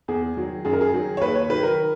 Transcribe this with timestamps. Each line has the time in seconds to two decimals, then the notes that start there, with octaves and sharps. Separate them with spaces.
0.08 E2 G#4
0.37 D#3 F#3
0.65 F#2 G#4
0.73 A#4
0.81 G#4
0.93 D#3 F#3
1.17 C#5
1.21 D#2 B4
1.35 C#5
1.49 D#3 F#3 B4
1.63 A#4